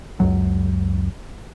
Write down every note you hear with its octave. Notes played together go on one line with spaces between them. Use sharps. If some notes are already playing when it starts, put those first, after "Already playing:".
C#2 F#2 F#3